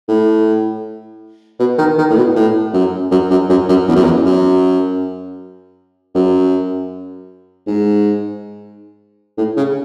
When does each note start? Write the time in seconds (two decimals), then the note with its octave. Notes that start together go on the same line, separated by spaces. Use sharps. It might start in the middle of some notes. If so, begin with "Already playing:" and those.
0.08 A2
1.59 B2
1.78 D#3
1.98 D#3
2.10 A2
2.17 B2
2.36 A2
2.74 F#2
3.11 F#2
3.30 F#2
3.49 F#2
3.69 F#2
3.88 E2
3.95 F#2
4.03 E2
4.25 F#2
6.15 F#2
7.67 G#2
9.38 A2
9.57 C#3